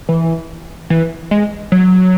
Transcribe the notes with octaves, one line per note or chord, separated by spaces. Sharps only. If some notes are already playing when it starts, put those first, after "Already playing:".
E3
E3
G#3
F#3